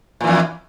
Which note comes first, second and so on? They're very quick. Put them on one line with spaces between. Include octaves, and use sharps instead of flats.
A#2 E3 F2